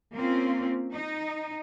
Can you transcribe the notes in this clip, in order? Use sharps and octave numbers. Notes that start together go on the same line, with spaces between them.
A#3 C4 C#4 F4
D#4